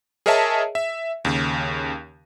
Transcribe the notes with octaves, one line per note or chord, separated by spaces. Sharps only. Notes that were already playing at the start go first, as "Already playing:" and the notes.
G#4 A#4 C#5 D#5 E5 A5
E5
D#2 C#3